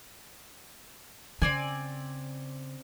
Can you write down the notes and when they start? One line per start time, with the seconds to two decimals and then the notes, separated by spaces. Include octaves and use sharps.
1.42 C#3 C4 D5 G#5